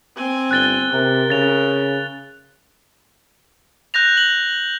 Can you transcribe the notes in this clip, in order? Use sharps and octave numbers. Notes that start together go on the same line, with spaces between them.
C4 G#5
G1 F#6 A6 G7
C3 A#4
C#3 A6 F7
F#6 G6 A#6 F7
F#7